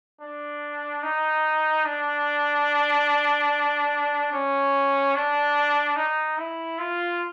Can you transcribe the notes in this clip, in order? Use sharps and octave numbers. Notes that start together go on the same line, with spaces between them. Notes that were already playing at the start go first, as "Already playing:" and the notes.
D4
D#4
D4
C#4
D4
D#4
E4
F4